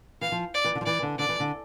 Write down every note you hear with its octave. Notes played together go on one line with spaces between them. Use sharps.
E3 F5
F3
D5
E3
D3
F3
E3 D5
D3
D3 D5
E3
D3